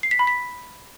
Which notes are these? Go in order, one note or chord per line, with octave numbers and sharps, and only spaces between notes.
C7
B6
B5
B6